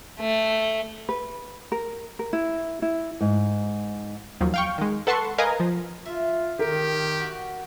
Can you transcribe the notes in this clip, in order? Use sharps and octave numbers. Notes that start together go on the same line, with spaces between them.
A3
B4
A#4
A#4
E4
E4
G#2
D#2 F3 F#3
F5 G5 C#6
D#3 G#3
A4 B4 F#5 A5 C6 C#6
A#4 B4 D#5 F5 G#5 A#5
F3
F4 E5
D#3 G4 A#4
F#4